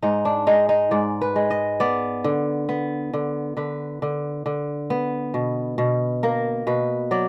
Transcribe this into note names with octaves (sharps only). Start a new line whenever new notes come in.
G#2 D#4
D4
G#3 D#4
D#4
G#2 D5
B4
G#3
D#5
B3 D5
D3
B3
D3
D3 B4
D3
D3
B3
B2
B2
A#3 A#4
B2 B4
F#3 D5